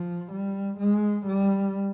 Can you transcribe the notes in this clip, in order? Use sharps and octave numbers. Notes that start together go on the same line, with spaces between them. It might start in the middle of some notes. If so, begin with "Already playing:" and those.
Already playing: F3
G3
G#3
G3